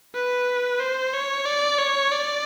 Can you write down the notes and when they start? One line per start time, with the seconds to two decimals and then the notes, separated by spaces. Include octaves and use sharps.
0.14 B4
0.80 C5
1.13 C#5
1.46 D5
1.79 C#5
2.12 D5